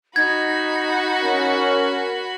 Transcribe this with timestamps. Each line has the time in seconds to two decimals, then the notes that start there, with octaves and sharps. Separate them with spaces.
0.16 D#4 F#4 B5 G#6
1.22 C#4 A#4